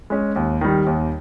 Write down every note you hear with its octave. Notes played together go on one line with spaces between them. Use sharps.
G#3 C#4
D#2
D#3 G3
D#2